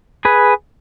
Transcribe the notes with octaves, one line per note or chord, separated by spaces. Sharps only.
G#4 B4